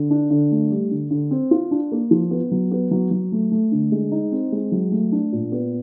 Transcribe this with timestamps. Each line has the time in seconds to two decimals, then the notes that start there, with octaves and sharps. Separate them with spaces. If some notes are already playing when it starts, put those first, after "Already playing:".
Already playing: D3
0.10 D4
0.31 D3
0.52 A3
0.71 G3
0.91 D3
1.11 D3
1.31 C4
1.51 F4
1.71 D4
1.92 A#3
2.11 F3
2.31 B3
2.51 F#3
2.71 B3
2.91 F#3
3.11 F#3
3.32 A3
3.51 A3
3.72 D3
3.92 G#3
4.11 D#4
4.32 C4
4.52 G#3
4.72 F#3
4.91 A3
5.12 D4
5.32 A#2
5.52 B3